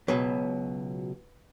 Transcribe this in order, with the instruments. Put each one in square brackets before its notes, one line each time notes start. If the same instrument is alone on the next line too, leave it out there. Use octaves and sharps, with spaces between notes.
[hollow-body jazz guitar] C#2 B2 F#3 B4